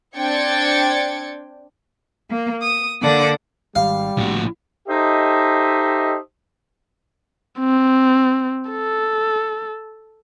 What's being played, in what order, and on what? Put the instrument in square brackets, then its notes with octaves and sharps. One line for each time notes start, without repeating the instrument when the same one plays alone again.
[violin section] C4 D4 G5 G#6 A6 C#7
[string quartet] A#3
D#6
D3 A#3 D5 F#5 A5 D6
[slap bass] G#1 [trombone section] G3 [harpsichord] F5
[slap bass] A#1 [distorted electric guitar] A2 F#4
[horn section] D#4 G4 A4 C5 D#5 E5
[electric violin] C4
A4